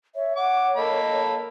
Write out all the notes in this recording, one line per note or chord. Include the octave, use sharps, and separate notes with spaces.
C#5 E5
F#5 D6
A#3 A4 D#5 B5